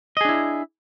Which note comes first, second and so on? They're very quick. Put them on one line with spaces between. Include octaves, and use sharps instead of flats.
D#5 G#4 D4 E4